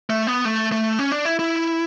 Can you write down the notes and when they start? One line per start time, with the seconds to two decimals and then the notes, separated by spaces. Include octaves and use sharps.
0.10 A3
0.27 B3
0.45 A3
0.72 A3
0.99 C#4
1.12 D4
1.25 E4
1.39 E4